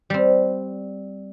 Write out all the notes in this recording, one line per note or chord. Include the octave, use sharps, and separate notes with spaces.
G3 C4